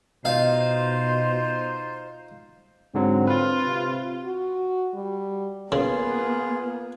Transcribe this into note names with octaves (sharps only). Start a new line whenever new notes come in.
B2 D#4 F4 C5 D#5 F5
G#2 D3 F#3 C4
F4 B4
C3
F#4
G3
C#3 A#3 B3 F4 G#4 B4